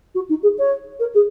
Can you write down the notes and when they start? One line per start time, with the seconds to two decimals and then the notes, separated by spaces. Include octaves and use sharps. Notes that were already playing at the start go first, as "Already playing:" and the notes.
0.15 F#4
0.29 D#4
0.43 G#4
0.58 C#5
0.99 A#4
1.14 G#4